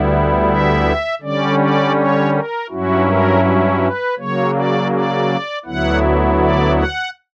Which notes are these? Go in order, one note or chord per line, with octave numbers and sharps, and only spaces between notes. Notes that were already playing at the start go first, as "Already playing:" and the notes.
Already playing: D2 D3 G3 B3 E4
E5
D3 G3 C#4 D5
D5
C#5
A#4
G2 F#3 C#4 E4 F#4
A#4
B4
C#3 F#3 A#3 C#5
D5
D5
D2 D3 F#3 B3 E4 F#5
D5
F#5